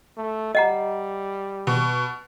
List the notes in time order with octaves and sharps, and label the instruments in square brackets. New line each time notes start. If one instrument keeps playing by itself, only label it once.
[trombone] A3
[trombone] G3 [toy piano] D#5 F#5 A#5
[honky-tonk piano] B2